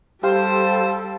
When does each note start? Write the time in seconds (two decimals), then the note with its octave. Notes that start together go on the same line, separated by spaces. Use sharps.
0.23 G3 G4 A4 C5 F5